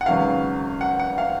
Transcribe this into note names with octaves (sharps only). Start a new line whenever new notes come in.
F#5
G#1 F#2 C#3 F#3 B3 F5
F#5
F#5
F5